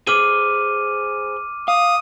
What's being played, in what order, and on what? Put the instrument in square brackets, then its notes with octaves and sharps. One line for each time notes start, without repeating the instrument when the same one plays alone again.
[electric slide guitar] G#4 B4 C5 [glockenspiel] D6 F6 D#7
[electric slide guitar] F5 [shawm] D#6